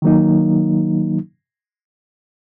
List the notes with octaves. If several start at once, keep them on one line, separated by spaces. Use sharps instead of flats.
D#3 F#3 A#3 D#4